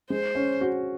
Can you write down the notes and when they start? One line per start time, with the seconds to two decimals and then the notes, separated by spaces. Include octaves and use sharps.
0.10 G#3 C5
0.35 C#4
0.61 F#4